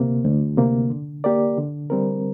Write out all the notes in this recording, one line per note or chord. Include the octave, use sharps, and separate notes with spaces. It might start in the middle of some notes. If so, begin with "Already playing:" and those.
Already playing: D2 C3 A#3
D2
C3 A#3
D3
A#3 G4 A#4 D5
D3
G3 C4 A#4